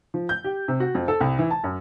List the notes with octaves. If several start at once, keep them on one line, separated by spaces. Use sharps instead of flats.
F3
G6
G4
C3
F#4
F2
A4
C2
E3
A5
F#2